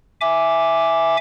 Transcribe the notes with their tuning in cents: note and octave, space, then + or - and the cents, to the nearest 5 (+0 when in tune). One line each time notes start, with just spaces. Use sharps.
E5 +0 G#5 +0 D6 -5